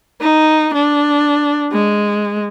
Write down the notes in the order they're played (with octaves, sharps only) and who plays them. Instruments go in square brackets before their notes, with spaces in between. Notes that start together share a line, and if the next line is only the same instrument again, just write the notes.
[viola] D#4
D4
G#3